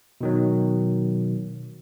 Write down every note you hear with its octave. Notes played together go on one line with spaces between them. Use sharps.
B2 D#3 F#3